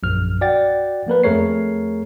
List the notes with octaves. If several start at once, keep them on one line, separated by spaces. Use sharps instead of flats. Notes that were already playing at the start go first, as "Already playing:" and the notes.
A#1 F#2 F6
F#4 D5 F#5 G5 A6
F3 A#3 A#4 B4
F2 A3 G#4 A#4 C#5 C7